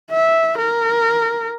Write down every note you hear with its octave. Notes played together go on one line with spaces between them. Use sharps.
E5
A#4